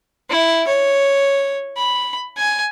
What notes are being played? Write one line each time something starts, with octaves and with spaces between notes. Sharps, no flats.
E4
C#5
B5
G#5